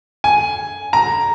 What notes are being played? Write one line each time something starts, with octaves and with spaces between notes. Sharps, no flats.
G#5
A#5